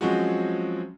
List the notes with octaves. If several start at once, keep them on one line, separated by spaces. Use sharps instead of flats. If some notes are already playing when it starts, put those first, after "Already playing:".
F3 F#3 G#3 C4 C#4 F#4